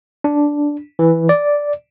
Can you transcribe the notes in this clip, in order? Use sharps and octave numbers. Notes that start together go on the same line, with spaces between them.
D4
E3
D5